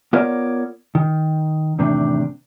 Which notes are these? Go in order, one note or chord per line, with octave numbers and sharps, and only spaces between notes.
B3 F4 A#4 C#5 D5
D#3
E2 A2 C3 D#3 C4 D4